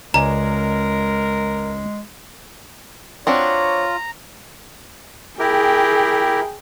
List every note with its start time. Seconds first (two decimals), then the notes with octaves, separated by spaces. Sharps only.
0.14 C#2 G#3 A#4 D5 G#5 A#5
3.27 C4 D4 F4 F#4 C#5 A#5
5.39 E4 G4 G#4 A#4 G5